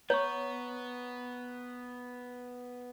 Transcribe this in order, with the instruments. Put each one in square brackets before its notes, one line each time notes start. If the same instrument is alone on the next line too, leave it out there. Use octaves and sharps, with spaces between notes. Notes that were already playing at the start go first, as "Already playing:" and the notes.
[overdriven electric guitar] B3 [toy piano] C#5 [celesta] A#5 C#6